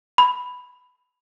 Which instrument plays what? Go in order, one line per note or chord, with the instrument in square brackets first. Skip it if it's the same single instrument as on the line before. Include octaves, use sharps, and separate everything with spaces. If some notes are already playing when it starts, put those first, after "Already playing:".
[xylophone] B5